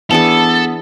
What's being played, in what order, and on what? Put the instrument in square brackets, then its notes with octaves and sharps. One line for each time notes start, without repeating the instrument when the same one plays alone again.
[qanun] E3 D4 G#4 [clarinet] B3 [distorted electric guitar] A4